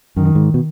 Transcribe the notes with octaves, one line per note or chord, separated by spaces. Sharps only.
F#2 D#3
G#2
B2